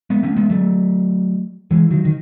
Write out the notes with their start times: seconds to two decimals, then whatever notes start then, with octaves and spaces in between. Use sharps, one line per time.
0.10 G#3 B3
0.23 A3 C#4
0.37 G#3 B3
0.50 F#3 A3
1.71 E3 G#3
1.91 D#3 F#3
2.05 D#3